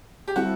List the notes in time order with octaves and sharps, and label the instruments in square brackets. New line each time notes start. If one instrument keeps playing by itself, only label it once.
[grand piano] G4
[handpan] G3 C4 E4 A4 [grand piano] F#4